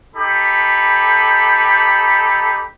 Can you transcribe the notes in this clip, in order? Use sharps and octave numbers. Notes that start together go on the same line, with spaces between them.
D#4 G4 A4 B5